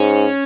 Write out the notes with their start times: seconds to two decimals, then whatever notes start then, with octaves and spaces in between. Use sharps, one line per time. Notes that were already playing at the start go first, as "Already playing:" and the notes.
Already playing: G#2 C#4